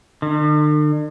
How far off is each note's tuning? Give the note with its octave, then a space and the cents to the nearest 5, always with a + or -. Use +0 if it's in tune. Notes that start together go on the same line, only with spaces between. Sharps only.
D3 +45